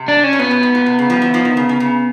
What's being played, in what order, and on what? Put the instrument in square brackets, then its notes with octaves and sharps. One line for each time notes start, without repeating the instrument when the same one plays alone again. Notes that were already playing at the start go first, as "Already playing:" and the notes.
Already playing: [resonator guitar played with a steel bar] C3
[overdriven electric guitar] D4
C#4
[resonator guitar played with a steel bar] B2
[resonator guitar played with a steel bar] A#2 [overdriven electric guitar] B3
[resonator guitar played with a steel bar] B2
G#2
A#2
C3
C#3
F3 G3
E3 F#3
D#3 F3
D#3
C#3
C#3
C#3